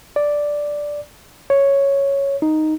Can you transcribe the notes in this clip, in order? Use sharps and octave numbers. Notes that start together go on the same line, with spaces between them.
D5
C#5
D#4